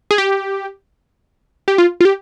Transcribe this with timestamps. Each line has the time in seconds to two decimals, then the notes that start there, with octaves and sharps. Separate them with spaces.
0.11 G#4
0.18 G4
1.68 G4
1.78 F4
2.01 F4
2.05 G4